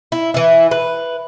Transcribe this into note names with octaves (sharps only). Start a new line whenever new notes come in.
E4
E3 E4
B4